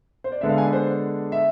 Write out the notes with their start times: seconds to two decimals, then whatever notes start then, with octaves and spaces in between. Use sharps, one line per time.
0.24 C5
0.32 D5
0.41 D3 G#3 B3 D4 E5
0.49 F5
0.58 G#5
0.67 B4
0.73 C5
1.32 E5